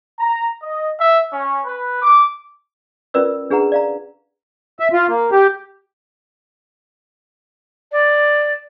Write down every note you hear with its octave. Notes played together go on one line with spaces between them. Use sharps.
A#5
D#5
E5
C#4
B4
D6
C#4 F4 A#4 B4 D5 E6
D4 G#4 B4 F#5 A#5
D5 F5 A#5
E5
F4
A#3
G4
D5